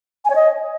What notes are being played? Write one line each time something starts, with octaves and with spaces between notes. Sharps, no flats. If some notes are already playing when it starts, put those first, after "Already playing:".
G#5
C#5
D#5